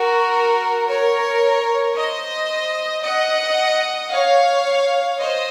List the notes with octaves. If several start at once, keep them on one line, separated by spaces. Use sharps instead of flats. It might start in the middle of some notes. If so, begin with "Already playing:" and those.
Already playing: F#4 A#4
A#4 C#5
C5 D#5
D#5 F#5
C#5 F5
C5 D#5